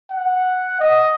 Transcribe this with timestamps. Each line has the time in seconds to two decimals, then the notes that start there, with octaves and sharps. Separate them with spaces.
0.11 F#5
0.80 D#5